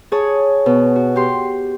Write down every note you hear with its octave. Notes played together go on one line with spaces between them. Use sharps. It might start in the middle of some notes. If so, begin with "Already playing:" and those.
G#4 C#5 A5
B2
F#4
G4 C6